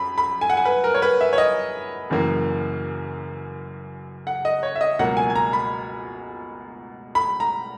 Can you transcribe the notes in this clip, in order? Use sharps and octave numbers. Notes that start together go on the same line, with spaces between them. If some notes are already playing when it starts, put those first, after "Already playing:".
Already playing: F#2 B5
B5
G#5
F#5
G#5
B4
A#4
C#5
B4
E5
C#5
D#5
F#1 F#2 E3 A#3
F#5
D#5
C#5
E5
D#5
C#2 B2 F#3 A#3 F#5
G#5
G#5
A#5
B5
B5
A#5